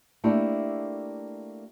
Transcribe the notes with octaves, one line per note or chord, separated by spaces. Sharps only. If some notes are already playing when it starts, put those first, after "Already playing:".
A3 A#3 D4 E4 G4 A4